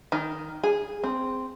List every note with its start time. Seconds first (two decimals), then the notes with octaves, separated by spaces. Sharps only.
0.12 D#3
0.64 G#4
1.04 C4